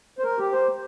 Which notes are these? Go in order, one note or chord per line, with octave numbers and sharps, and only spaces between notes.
C5
A#4
G4
C5